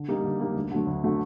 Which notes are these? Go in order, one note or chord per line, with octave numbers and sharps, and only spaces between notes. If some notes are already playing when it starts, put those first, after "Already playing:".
Already playing: D3
G3 A#3 D#4
D3
G3 A#3 D#4
D2
D3 F#3 A3
D2
D3 F#3 A3